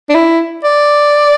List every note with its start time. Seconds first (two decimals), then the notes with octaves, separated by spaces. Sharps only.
0.10 D4
0.15 E4
0.64 D5